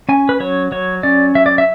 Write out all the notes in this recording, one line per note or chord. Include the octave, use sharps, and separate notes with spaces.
C#4 G#5
B4
F#3 C#5
F#3 C#5
C#4 D5
F#3 E5
D5
E5